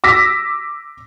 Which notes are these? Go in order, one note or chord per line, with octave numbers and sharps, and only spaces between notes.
D6 E6 A#6 B6